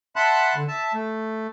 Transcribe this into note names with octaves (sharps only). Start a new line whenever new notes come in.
E5 F#5 A5 B5 C6 F#6
D3
E5 A5
A3